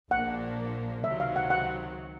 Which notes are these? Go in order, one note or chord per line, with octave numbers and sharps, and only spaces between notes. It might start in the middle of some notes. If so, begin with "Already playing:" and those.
A#1 A#2 F3 A#3 D4 F#5
C#2 C3 D#3 F#3 E5
F5
F#5
F#5